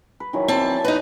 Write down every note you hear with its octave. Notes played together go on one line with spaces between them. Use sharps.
B4
D#3 E3 F#3
C4 A5
D5
D#4 B4